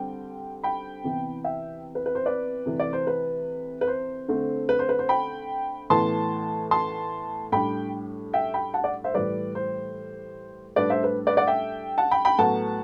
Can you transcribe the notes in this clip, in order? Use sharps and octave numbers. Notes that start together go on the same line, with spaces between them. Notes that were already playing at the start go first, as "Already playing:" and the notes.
Already playing: D3 G3 C4 G5
G5 B5
C3 E3 B3 E4
E5 G5
B4
B4
C5
B4 D5
C3 E3 A3
D5
C5
B4
B4
C5
D3 A3 C4
B4
C5
B4
C5
G5 B5
A2 E3 B3 A5 C6
A5 C6
A2 G3 D4 G5 B5
E5 G5
G5 B5
F#5 A5
D5 F#5
C5 E5
A2 E3 G3 B4 D5
C5
A2 G3 D4 B4 D5
C5 E5
B4
B4 D5
D5 F#5
E5 G5
F#5 A5
G5 B5
G5 B5
A2 F#3 B3 F#5 A5